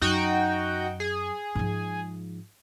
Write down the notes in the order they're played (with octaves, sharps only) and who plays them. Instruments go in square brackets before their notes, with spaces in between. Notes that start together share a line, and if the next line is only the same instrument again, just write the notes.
[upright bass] F#2 [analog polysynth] D#4 F#4 G5
[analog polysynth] G#4
[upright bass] G#2 F3